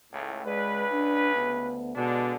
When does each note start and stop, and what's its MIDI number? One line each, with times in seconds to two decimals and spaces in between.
0.13 0.44 37
0.13 0.44 45
0.46 1.77 37
0.46 0.86 56
0.46 1.77 71
0.46 0.86 74
0.92 1.30 62
1.35 1.94 38
1.35 1.94 59
1.96 2.34 47
1.96 2.35 50
1.96 2.35 56
1.96 2.35 62